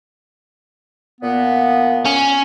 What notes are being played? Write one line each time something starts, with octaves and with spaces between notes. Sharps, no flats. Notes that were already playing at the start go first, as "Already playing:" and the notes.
A#2 B3
C#4